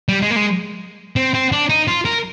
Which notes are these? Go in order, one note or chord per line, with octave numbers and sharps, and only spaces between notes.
G3
G#3
A#3
G#3
C4
C4
D4
D#4
F4
A#4